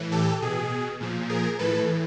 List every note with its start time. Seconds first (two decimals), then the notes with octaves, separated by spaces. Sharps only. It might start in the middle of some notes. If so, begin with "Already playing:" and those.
Already playing: A2 E3
0.12 G4 A4
0.42 B2 G#4
1.00 A#2 F3
1.29 G#4 A#4
1.59 A2 E3 A4 B4